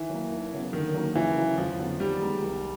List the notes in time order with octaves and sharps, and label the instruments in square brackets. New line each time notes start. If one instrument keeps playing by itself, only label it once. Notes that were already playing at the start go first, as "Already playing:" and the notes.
Already playing: [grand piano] D#3 [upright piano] E3
[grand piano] F#3 A#3
D#2
C#3 F#3 B3
[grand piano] D3 [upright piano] D#3
[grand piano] F#3 A#3 D#4 F#4
[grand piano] C#3 [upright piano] E3
[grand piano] F#3 A3 C#4 E4
[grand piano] F2 [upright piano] F3
[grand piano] D3 F#3 B3
[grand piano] D#3 [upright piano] G3
[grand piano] G#3 B3 D#4
C2